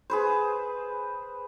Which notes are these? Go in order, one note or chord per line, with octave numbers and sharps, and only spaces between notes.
G#4 B4 C5